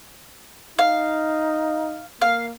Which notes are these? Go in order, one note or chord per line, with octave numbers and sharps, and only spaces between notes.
D#4 F5
A#3 F5